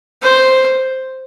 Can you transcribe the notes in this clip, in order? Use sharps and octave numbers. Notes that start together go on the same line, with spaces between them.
C5